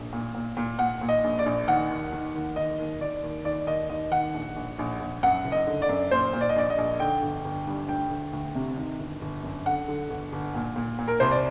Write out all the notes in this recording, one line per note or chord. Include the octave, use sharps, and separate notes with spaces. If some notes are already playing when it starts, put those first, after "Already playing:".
Already playing: A#1
A#2
A#2
A#2
A#2 F#5
A#2
D#5
A#1
D5
A#1
D#3 F#5
D#2
D#3
D#2
D#3 D#5
D#2
D#2 D5
D#2
D#3 D5
D#2 D#5
D#2 D#5
D#3 F#5
A#1
A#1
A#1
A#1
F#2 F#5
F#1
D#5
D3
D5
F#2
A#2 C5
A#2
D5
D#5
A#1 D5
D#5
A#1
D3 G5
G1
G1
G2
D2 G5
D2
D2
C3
D#3
G1
G1
F#2
D3 F#5
D3
G1
G1
A#2
A#2
A#2
A#4
C2 C5
D5